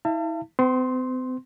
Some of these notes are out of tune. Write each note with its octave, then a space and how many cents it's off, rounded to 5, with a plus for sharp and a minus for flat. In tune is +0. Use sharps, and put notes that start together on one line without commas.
E4 -35 F5 -45 A5 +30
C4 -40 C6 +5